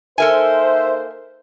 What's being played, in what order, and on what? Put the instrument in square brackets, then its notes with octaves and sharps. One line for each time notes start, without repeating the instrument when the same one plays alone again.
[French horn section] A#3 D#4 C5 [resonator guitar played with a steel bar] A4 A#4 G#5 [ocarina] E5